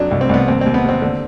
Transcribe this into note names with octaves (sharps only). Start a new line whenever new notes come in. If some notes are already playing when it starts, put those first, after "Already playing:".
Already playing: F2 F#3 D4
C2
C4
C2 B3
D#2 C4
D#2 C4
B3
D#2 C4
D3